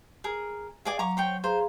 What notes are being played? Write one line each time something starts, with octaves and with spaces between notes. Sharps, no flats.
G#4 A#4
G#4 D5 F5 G#5
F#3 A#5 C#6 D6
C5 C#5 G5
G#4 C5 F5 A#5